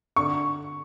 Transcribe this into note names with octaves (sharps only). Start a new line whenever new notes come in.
D3 C#6